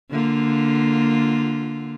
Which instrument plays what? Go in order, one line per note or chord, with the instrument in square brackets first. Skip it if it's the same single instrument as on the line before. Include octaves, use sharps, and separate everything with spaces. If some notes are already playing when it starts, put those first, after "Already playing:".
[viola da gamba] D3 A#3 F4